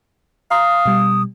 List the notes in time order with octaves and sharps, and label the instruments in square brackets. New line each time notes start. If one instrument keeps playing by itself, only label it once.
[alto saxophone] F5 [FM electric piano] A#5 C6 [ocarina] D#6
[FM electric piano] B2 G3